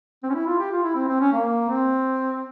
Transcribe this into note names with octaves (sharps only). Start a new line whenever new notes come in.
C4
C#4
E4
F4
G4
F4
E4
C4
C4
C#4
A#3
C4